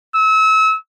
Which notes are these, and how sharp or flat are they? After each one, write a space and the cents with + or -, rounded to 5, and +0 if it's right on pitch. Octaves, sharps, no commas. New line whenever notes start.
E6 -35